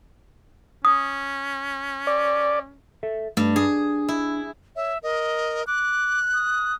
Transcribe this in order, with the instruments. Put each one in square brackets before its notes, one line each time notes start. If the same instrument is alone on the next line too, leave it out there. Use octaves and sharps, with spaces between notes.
[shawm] C#4 [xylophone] D#6
[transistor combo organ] D5
[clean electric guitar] A4 E5
[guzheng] G2 [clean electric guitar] A3
[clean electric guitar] D4 [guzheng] G#4
[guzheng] E4
[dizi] C#5 [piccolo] E5
[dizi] A#4 [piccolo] D#5
[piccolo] D6 [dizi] F#6
[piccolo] D#6